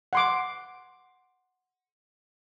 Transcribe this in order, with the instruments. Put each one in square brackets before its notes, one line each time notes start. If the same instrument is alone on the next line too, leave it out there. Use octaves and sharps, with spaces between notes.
[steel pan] F#5 C6 D6